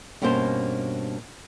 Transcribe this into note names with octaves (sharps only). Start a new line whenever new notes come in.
G2 B2 A#3 C#4 C5